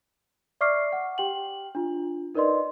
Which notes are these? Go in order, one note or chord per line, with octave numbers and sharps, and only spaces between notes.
D5 E5 C#6 D6 F6 C7
F#5
G4 G5 F#7
D4 F4
D#4 A#4 B4 D5 D#5 C6